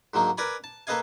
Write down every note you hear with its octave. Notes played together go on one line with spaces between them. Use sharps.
G#2 D3 F#3 A#3 D#4
A#4 B4 D5 G#5 A#5 B5
A5
A#3 A4 B4 D#5 F5 G#5